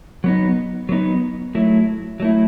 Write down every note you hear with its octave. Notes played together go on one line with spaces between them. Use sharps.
F#3 B3 D#4
F#3 B3 D#4
F#3 A3 E4
F#3 A3 E4